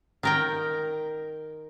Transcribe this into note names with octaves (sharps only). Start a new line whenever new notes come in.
D#3 A#4 G5